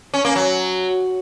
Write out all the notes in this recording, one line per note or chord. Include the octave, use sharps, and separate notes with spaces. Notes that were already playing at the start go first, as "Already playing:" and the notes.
C#4
A#3
F#3